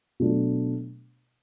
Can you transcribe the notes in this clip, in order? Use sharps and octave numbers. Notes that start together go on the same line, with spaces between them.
B2 F#3 A3 D4